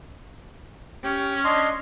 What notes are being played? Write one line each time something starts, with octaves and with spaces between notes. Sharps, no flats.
C#4 G4
D4 D#5 C6